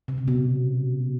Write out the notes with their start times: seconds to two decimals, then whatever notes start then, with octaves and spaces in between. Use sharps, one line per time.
0.08 C3
0.18 C#3
0.28 B2